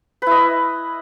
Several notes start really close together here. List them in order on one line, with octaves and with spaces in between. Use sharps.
B4 E4 D#5